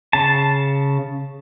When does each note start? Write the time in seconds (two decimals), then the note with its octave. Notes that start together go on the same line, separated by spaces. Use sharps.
0.13 C#3 A5